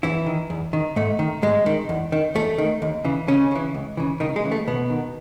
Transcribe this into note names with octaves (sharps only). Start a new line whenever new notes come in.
E2 E3 E4
D#3
E2
D#3
G#2 A3
D#3
G#2 G#3
D#3
E2
D#3
E2 A3
D#3
D#2
C#3 E3
D#2 C#3 C#4
C#3 E3
C#2
C#3 E3
C#2 D#3 D#4
G#3
C#3 E3
A3
D#2 B2 B3
D#3